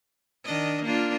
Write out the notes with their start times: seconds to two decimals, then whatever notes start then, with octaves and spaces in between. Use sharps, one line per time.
0.44 D#3 D4 D#5
0.84 A#3 D4 F4